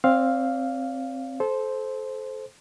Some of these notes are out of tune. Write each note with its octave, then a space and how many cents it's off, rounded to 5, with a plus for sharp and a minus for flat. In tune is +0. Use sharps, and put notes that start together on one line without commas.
C4 +10 D5 -35 F5 +0
A4 -25 C5 +0